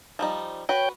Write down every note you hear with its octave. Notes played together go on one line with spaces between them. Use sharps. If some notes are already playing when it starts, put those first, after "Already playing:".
F3 G3 D#4
F#4 B4 C#5 G5 G6